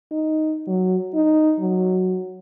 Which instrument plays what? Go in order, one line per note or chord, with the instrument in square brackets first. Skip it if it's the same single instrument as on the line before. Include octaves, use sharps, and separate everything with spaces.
[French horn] D#4
F#3
D#4
F#3